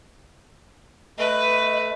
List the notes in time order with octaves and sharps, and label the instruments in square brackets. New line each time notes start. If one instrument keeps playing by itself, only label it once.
[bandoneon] A3 [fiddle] B4 [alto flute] D#5